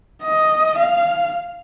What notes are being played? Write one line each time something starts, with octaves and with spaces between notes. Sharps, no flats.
D#5
F5